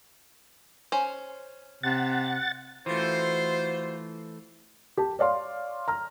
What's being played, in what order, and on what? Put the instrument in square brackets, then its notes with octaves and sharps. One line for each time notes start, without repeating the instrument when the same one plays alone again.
[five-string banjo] C#4 C5
[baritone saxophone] C3 [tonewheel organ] F#5 A6
[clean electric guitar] E3 A3 [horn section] F4 F#4 C5
[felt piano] G4 A5
C#5 D5 F5 C6
A#5 F6